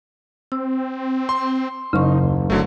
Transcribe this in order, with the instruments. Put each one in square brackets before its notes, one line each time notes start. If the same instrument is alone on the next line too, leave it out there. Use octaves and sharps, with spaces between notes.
[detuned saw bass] C4 [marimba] E6
[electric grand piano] C6
[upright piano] F#1 [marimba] C#3 C#6 [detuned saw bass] D#4
[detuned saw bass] D#2
[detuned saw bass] F1 [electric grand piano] D3 F#3 A3